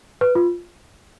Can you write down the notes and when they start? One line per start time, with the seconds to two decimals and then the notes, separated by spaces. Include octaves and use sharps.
0.21 B4
0.35 F4